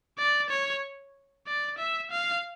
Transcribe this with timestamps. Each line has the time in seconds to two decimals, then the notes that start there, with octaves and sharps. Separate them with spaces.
0.18 D5
0.50 C#5
1.46 D5
1.78 E5
2.11 F5